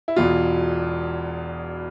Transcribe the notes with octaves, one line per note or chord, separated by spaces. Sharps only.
E4
E1 E2 B2 F4